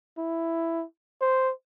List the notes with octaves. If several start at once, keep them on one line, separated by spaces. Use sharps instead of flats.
E4
C5